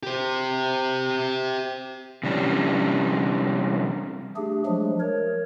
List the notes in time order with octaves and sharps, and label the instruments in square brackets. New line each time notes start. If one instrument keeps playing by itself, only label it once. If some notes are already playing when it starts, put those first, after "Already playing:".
[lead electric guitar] G4 C5
[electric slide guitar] C3 E3 G3 C#4 D4
[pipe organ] A3 D4 G4 G#4
F3 F#3 G#3 A3 D4
A#4 C#5